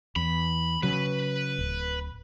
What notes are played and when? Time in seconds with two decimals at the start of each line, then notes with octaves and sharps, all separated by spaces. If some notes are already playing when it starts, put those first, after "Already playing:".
0.16 E2 B5
0.83 C#3 F#3 B4
1.59 D1